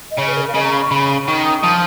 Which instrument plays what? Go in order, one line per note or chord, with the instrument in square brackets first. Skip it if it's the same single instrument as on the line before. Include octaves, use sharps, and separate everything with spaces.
[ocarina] D#5
[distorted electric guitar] C#3 [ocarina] C#5
[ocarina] B4
A#4
F5
[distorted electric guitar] C#3 [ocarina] D#5
[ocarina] A#5
B5
C#6
[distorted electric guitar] C#3 [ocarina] B5
[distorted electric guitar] D#3 [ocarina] C#6
[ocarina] D#6
[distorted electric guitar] F3 [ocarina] D#6